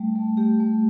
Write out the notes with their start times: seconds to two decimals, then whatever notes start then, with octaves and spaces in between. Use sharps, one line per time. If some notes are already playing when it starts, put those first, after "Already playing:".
Already playing: G3 A3
0.16 A3
0.37 A3 G4
0.60 A3